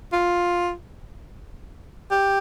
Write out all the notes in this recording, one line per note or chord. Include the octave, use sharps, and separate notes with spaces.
F4
G4